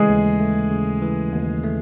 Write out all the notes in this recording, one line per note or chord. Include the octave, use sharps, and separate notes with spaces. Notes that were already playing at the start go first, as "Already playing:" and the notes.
Already playing: C#3 E3 G#3 A3 G#4
D#2
A3
C#3
E3
D#2
A3